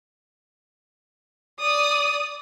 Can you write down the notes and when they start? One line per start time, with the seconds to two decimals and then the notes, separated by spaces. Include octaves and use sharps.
1.60 D5 D#6